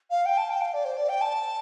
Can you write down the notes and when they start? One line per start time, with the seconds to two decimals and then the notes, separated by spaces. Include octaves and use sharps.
0.10 F5
0.25 G5
0.37 A5
0.49 G5
0.61 F5
0.73 D5
0.85 C5
0.97 D5
1.09 G5
1.21 A5